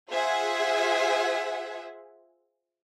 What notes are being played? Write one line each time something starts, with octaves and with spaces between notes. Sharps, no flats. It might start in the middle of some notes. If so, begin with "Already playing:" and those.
F4 G#4 C5 E5 F#5 G#5